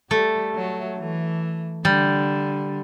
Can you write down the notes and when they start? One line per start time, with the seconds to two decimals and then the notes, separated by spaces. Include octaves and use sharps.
0.10 G3 A3
0.55 F#3
0.98 E3
1.85 D3 G3